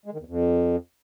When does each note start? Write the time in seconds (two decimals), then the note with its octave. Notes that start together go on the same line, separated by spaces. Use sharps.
0.06 G#3
0.13 D#3
0.20 E2
0.27 F2